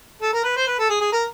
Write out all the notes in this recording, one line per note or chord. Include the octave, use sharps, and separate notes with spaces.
A4
A#4
B4
C5
B4
A4
G#4
G#4
A#4